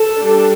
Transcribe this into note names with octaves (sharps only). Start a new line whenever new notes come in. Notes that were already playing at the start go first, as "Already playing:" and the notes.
Already playing: A4
G3 D4